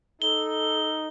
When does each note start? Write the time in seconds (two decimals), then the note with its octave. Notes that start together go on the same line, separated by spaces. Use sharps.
0.22 D#4 A4 G7